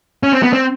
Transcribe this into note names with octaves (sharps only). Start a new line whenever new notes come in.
C#4
C4
B3
C4